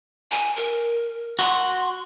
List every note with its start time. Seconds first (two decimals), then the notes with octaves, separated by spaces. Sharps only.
0.31 G#5
0.56 A#4
1.39 F#4 C6